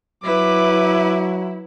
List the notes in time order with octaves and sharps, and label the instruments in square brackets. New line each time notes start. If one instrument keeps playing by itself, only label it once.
[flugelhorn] F#3 [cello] E4 [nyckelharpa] B4 D6